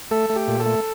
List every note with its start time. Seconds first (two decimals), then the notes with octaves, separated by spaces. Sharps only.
0.11 A3 A4
0.30 A3
0.36 G4
0.48 A#2
0.60 A4
0.66 A3